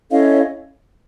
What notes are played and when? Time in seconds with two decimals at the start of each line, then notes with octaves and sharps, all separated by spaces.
0.11 C#4 E4 A4 C#5 D#5 F5